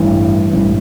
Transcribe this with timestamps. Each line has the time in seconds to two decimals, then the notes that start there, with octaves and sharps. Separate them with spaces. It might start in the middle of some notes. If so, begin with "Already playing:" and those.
Already playing: A1 G2 E3
0.53 A1 G2 E3